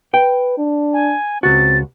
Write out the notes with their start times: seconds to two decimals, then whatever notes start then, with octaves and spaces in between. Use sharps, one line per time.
0.14 B4 G5
0.58 D4
0.93 G#5
1.43 C#2 C4 F#4 A6